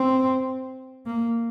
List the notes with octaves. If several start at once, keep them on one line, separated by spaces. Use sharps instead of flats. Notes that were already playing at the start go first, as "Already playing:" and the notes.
Already playing: C4
A#3